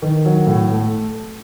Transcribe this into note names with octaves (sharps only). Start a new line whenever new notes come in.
D#3
F#3
A2
A3